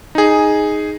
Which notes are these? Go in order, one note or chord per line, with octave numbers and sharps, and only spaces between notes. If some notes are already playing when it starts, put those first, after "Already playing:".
D#4 G#4